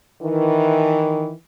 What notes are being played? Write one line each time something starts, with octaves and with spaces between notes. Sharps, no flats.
D#3 E3